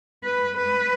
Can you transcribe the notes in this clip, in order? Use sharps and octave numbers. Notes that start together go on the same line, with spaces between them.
B4
B4